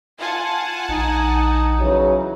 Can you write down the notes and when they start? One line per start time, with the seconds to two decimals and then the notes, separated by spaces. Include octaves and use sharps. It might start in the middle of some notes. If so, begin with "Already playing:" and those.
0.19 F4 F#5 G#5 A5
0.89 A#1 D#4
1.80 C#3 E3 F#3